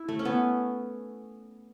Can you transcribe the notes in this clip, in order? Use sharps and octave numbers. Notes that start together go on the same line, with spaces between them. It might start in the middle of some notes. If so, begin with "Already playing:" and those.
Already playing: E4
A3
C#4
B3